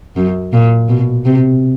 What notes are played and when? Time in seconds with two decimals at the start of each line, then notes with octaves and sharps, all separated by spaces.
0.16 F#2
0.53 A#2
0.89 B2
1.25 C3